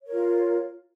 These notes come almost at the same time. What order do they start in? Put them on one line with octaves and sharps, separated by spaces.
C#5 A#4 F4